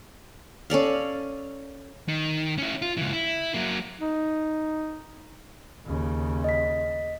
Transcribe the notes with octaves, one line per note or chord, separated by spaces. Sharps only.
C#4 A4 D5 F5
D#3
C#4 E4
F4
C#2 E3
E4
F#3 A#3
D#4
D#2 C#3
D#5 B6